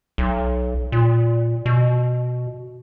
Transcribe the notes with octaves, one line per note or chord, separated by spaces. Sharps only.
B1
A#2
B2